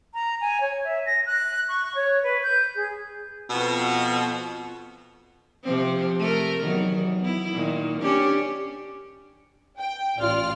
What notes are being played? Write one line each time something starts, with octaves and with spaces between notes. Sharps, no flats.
A#5
G#5
C#5
E5
A#6
F#6
C#6
C#5
B4
G6
G#4
F2 B2
C3 F3 C4
A3 A#4
E2 D#3 F#3
B3 E4
A#2 D#3
C#4 D4 G4
G5
A1 F4 D5 F6